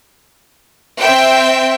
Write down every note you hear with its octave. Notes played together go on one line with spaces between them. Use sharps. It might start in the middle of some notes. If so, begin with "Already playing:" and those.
C4 E5 G5